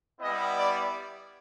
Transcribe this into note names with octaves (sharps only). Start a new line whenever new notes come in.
G3 B3 E4 D#5
D5